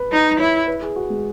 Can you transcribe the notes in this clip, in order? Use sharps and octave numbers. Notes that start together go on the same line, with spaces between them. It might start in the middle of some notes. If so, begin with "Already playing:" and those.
Already playing: B4
D#4
E4 C#5
B4
G#4
F#4
G#3